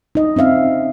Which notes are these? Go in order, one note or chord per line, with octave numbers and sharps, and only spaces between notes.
D#4 D#5
C4 C#4 E5 F5